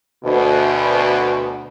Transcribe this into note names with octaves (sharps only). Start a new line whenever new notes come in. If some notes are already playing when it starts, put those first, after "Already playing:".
D2 B2